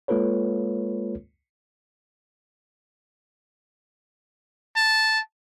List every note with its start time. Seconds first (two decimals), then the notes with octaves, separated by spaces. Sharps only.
0.08 G#3 A#3 F4 A4 B4 C#5
4.76 A5